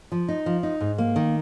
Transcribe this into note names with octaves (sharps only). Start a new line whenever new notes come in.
F3
D#4
F3
D#4
G#2
A#3
D#3